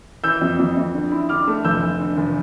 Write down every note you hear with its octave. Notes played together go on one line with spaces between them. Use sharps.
E3 E6 G6
F2
F2
F2
D3
E4
D3 D6 F6
A3
F1 E6 G6
F1
D3
F1